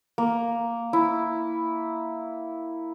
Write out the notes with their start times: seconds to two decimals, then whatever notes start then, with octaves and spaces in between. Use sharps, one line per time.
0.18 A#3
0.93 E4